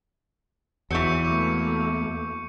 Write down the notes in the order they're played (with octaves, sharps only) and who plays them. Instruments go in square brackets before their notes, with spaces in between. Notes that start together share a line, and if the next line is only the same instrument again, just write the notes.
[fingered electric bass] E2 [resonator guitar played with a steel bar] E3 F#3 [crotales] C#6 G6 C#7
[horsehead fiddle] A3 A#3 [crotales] D6